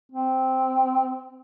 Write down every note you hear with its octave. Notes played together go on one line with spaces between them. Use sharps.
C4